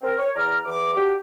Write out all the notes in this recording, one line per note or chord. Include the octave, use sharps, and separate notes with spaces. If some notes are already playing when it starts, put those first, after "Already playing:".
C4 A#4
C#5
E2 D5 A#5 F6
E2 D6
D4 F#4 G4